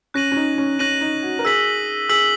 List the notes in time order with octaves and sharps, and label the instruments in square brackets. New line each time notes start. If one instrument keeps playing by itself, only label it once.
[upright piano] C#4 [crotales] F#6 A#6 D#7 F#7
[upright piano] C#4
D#4
C#4
[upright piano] C#4 [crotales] F#6 A#6 D#7 F#7
[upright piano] D#4
F#4
A#4
[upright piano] G#4 [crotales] E6 B6 F#7
[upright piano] G#4 [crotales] E6 B6 F#7